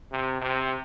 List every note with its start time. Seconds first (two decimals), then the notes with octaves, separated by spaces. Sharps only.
0.12 C3
0.41 C3